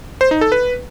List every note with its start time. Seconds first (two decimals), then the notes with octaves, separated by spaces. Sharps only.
0.21 C5
0.31 D#4
0.41 A4
0.52 B4